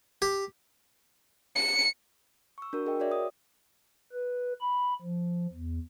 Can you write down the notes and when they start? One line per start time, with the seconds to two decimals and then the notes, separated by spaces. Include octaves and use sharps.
0.22 G4
1.56 C#7
2.58 C#6 E6
2.73 D4 F#4 A#4
2.86 G#4 A#4 D#5 G5
3.00 F#4 C#5 D5 E5
3.12 D#6
4.12 B4
4.61 B5
5.02 F3
5.53 E2